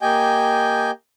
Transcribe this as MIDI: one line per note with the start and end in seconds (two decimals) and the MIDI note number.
0.02 0.91 58
0.02 0.91 67
0.02 0.91 75
0.02 0.91 79
0.02 0.91 80
0.02 0.91 91